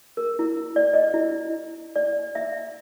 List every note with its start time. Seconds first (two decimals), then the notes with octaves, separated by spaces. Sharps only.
0.17 A#4
0.39 E4
0.76 D5
0.94 D#5
1.14 E4
1.96 D5
2.35 E5